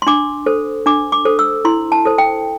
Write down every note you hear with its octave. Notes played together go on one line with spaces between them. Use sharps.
C6
D4 D6
A4 C5
D4 D6
D6
A4 C5
E6
E4 C6
A5
A4 C5
G5